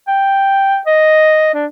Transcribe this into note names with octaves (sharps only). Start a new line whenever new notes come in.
G5
D#5
D4